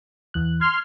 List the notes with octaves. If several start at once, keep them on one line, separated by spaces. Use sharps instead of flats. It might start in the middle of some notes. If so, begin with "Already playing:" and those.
E2 E3 F#6
C6 F6 G#6